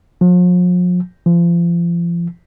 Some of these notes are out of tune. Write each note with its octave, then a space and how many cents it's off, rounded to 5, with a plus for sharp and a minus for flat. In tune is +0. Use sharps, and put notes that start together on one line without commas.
F3 +40
F3 -35